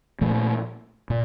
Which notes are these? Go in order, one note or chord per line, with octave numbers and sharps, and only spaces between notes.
A#2 F3 A3
A#2